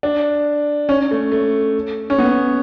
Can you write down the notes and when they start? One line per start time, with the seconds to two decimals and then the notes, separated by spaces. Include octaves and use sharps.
0.03 D4
0.89 C#4
1.11 A3
1.32 A3
2.10 C#4
2.18 B3